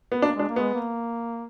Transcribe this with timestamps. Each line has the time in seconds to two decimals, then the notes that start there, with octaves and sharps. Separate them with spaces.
0.12 B3
0.22 A#3 D4
0.35 G#3
0.39 D4
0.48 A#3
0.56 G#3 B3
0.74 A#3